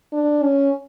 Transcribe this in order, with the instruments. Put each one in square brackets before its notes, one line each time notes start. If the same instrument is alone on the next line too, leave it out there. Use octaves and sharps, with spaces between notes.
[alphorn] D4
C#4